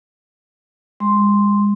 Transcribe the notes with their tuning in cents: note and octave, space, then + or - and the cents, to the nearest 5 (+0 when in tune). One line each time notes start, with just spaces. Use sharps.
G#3 -40 C6 +0